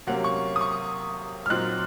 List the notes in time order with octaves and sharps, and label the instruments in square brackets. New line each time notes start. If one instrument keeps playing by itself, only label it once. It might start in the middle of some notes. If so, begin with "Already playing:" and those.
[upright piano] C3 F#3 A#3 C#4 F#5
C#6
D#6
C#6
F6
A#2 F#3 C4 D#4 F#6